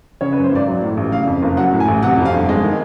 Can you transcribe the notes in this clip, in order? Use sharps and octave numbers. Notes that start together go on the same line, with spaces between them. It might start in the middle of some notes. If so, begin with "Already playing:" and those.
C#3 C#5
B4
F#2
C5
G#1 D5
F#3
A2
A1
C#3 F5
F2
F#1
F#3 F#5
A2
G#5
A1
C3 F#5
F2
F5
G1
G#3 D#5
D#3